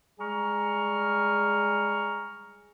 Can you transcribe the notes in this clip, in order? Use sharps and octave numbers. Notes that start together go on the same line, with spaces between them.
G3 G#3 G#4 A#5 C#6 F6